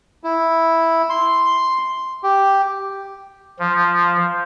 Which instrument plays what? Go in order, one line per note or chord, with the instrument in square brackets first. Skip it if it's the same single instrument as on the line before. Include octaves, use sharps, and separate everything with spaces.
[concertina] E4
C6
G4
[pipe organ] F3